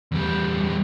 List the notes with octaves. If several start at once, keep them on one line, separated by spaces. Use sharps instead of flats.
E2 G3